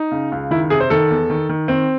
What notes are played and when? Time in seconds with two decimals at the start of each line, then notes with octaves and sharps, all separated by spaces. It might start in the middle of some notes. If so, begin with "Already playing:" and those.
Already playing: D#4
0.12 C#3
0.32 C#2
0.51 D#3 E4
0.70 C3 G#4
0.80 C5
0.90 D#3 A4
1.10 E2
1.30 D#3
1.49 D#3
1.68 D#3 C4